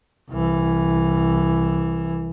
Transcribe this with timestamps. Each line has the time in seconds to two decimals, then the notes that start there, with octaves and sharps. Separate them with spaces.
0.30 C2 E3